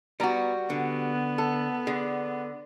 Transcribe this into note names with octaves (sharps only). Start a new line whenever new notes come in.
G3 B3 F#4 A#5
D3 B3
A4
D3 G#4